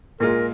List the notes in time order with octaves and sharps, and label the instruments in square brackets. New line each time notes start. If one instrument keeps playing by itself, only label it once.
[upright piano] A#2 G#3 F4 [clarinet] A#4